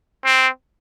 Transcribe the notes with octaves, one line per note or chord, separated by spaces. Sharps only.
C4